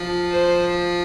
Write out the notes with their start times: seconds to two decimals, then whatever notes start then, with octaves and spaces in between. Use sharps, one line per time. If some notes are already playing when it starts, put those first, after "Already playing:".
Already playing: F3
0.31 C5